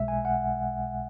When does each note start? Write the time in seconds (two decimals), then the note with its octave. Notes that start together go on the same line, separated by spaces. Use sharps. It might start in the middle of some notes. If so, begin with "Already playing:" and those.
Already playing: B1 B2 G#3 E5
0.08 G#5
0.25 F#5